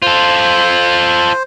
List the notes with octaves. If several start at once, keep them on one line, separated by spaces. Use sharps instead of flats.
F4 A4 C5